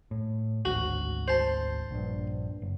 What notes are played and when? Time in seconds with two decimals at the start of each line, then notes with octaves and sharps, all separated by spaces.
0.11 A2
0.65 G#1 D2 F#4
1.28 C5 A5
1.91 A#1 G2
2.62 F#1